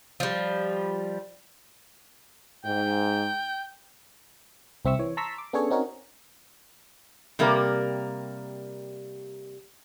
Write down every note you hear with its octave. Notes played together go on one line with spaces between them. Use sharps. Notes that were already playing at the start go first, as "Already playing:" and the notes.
F3 G3
G#2 G5
C2 C4 E5 C#6 E6
E3 C#5
A5 A#5 C6 C#6 E6 B6
D6
B3 C#4 D4 G#4 A4 C#5
C4 C#4 D#4 F#4 A#4 C#5
C3 G3 A#3 A#4 D5